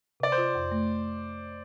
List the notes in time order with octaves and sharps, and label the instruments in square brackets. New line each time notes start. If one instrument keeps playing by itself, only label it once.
[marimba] C3 [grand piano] D5
[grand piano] C5
[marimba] F4
F2
A3